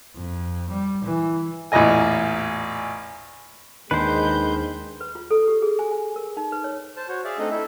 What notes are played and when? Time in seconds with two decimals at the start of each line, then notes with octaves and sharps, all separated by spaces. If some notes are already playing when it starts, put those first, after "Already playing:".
0.16 F2
0.70 G3
1.04 E3
1.72 A1 E2 A#2 D#5 G#5
3.91 D#2 D#3 G#3 D4 B4 C5 G6
5.01 B4
5.15 F4
5.31 A4
5.48 G4
5.62 G#4
5.79 G#5
5.91 G#5
6.16 A#4
6.37 D#4
6.52 B4
6.64 C#5
6.97 C5 A5
7.08 F#4 C5 C#5
7.24 G#4 D5 E5 F5
7.39 A3 C4 D4 D#4 A4 D#5
7.50 E4 A4 E5